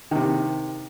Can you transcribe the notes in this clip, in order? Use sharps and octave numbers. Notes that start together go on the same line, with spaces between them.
C3 D#3